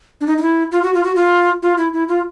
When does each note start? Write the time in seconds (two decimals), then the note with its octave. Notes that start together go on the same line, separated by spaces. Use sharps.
0.21 D4
0.27 D#4
0.38 D#4
0.42 E4
0.72 F4
0.83 F#4
0.94 F4
1.04 F#4
1.16 F4
1.63 F4
1.78 E4
1.93 E4
2.08 F4